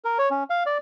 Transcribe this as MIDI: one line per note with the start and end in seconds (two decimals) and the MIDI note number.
0.05 0.18 70
0.18 0.29 73
0.31 0.43 61
0.50 0.63 77
0.66 0.78 74